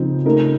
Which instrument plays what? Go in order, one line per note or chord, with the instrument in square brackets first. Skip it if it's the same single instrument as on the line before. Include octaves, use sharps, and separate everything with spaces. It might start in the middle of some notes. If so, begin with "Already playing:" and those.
Already playing: [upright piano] C#3 F3 C4 D#4
C#3 A3 D#4 A#4